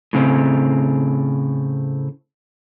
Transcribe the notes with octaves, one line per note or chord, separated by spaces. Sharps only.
A2 C#3 C4